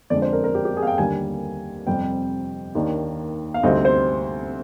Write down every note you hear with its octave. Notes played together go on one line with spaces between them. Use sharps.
F2 D3 G#3 D4 D5
C5
A#4
A#4
G4
G4
G#4
F5
G5
D#2 D3 G3 A#3 G#5
F2 C3 G3 C4 G5
D#2 D#3 A#3 D4
F5
D2 C3 G3 C4 D#4 D#5
C5